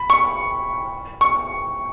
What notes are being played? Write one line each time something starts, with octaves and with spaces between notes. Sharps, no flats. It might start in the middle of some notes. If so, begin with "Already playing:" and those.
Already playing: B5
C#6
C#6